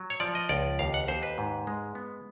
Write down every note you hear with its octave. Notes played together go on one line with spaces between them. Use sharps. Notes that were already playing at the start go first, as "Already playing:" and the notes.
Already playing: F#3
C#5
F3 D5
D#5
C#2 D5
D#2 F5
F#5
D#2 C5
B4
G#2
G#3
B3